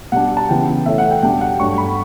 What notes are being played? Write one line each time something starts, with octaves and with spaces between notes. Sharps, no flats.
B2 G3 D4 F#5
A5
C#3 E3 B3 G5
B2 A3 C#4 E4 E5
F#5
G5
E2 B2 G3 D4 G5
F#5
G2 F#3 A3 D4 C#6
B5